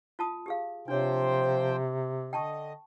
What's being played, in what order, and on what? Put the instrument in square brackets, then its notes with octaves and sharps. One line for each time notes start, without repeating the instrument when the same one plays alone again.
[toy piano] F4 A5 D#6
G4 G#4 F5
[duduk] C3 [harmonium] F3 C5 G5 [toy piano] D4 C#5
[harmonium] D3 D#5 [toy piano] G5 A5 C#6